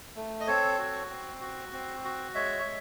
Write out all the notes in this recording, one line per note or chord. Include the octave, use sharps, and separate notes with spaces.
A3
D#5
C4 A4 C#5
F#4
C4
F#4
C4
F#4
G#3 C#5 E5
G#3